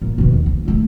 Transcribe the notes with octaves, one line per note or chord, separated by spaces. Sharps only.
A#2
B2 D#3
D#2
D2
A#2 A3